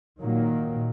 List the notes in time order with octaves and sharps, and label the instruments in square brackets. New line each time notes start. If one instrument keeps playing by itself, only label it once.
[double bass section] A#2 D#3 F#3 A#3